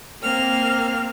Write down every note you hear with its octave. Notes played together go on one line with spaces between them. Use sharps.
A#3 C4 F6